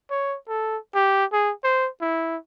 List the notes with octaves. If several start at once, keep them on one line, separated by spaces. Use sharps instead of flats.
C#5
A4
G4
G#4
C5
E4